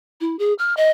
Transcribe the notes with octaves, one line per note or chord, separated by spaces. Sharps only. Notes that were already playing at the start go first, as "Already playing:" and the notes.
E4
G#4
F6
D#5